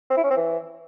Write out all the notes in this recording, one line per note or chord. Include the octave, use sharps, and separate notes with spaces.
C4
E4
C#4
C4
E3